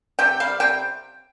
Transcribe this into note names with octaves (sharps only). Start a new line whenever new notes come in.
C3 G5
G3 F5
C3 G5